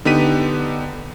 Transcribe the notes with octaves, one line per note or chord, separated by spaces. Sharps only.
D3 B3 D#4 G4 B6 D#7